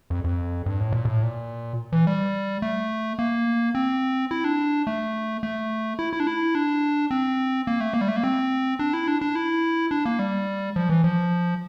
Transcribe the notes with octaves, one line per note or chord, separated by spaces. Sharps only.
F2
F2
G2
A2
A#2
A2
A#2
E3
G3
A3
A#3
C4
E4
D4
A3
A3
E4
E4
D4
E4
D4
C4
A#3
A3
A#3
G3
A3
A#3
C4
D4
E4
D4
D4
E4
D4
A#3
G3
F3
E3
F3